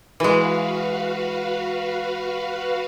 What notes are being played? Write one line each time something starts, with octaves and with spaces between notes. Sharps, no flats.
E3 G#3 F#4 B4 F5